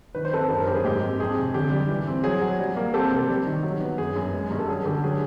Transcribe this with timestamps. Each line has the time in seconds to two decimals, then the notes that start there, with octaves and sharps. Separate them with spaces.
0.15 D#3 B4
0.25 C5
0.32 C4 A4 B4
0.49 F#2 A4 B4
0.58 A#4 C5
0.67 F#2 G4
0.76 G#4
0.85 G#2 G4
1.02 C4
1.20 F2 G#4
1.37 C3
1.54 D3 G4
1.71 G3
1.89 E3
2.07 C4
2.24 F#3 G#4
2.42 F#3
2.59 G3
2.76 A#3
2.94 C4 G4 A4
3.11 C3
3.28 G3
3.47 D#3
3.63 F#3
3.81 B3
3.98 F#2 G#4
4.16 F#2
4.34 G#3
4.50 G2
4.59 A4
4.68 F#3 G#4
4.85 D3 G4 A4
5.04 F#3 G#4